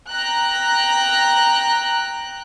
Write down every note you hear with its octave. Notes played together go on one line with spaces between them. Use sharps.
G5 A#5 F#6